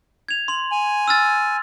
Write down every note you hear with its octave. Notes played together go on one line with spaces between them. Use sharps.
G#6 F7
C6 F#7
G#5
E6 F6 A6